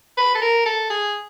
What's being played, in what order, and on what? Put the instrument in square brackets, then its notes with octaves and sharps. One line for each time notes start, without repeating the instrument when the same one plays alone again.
[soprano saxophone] B4
A4
A#4
A4
G#4